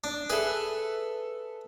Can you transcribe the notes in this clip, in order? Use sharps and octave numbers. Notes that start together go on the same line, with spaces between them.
D4
G#4 A4 B4 E5